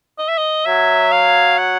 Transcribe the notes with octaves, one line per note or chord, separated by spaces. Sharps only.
D#5
E5
D#5
F#3 E5
F5
F#5